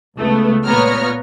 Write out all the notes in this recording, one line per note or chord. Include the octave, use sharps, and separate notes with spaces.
C#2 A3 B3
A#2 B3 C#5 A#5 F6